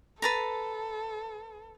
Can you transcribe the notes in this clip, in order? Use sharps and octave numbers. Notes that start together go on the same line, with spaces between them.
A4 B4 A5 A#5